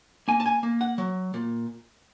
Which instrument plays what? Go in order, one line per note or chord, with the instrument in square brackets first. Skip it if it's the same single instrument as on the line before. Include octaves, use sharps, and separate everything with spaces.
[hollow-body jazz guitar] A#3 G#5
A5
G#5
A#3
F#5
F#3
A#2